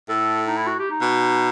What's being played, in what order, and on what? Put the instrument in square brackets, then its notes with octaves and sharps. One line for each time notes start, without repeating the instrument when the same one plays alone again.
[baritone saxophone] A2 [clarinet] A4
[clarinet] D#4
E4
F#4
G4
D#4
[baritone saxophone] B2